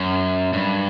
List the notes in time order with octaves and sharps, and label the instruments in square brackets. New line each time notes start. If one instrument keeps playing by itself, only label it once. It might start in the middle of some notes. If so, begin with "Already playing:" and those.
Already playing: [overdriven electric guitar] F#2
G2